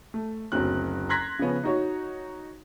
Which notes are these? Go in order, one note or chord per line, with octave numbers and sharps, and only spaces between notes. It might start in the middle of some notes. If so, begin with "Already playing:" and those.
A3
F#1 D2 F#3 C4 F#6
A#5 C6 F#6 G#6 A#6 B6
C#3 F3 B3 C#4
D#4 F#4 C#5